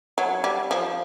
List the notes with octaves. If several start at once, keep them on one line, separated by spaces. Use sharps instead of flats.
F#3
G3
F3